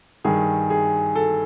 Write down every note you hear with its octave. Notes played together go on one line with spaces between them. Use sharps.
G2 D#3 G#4
G#4
A4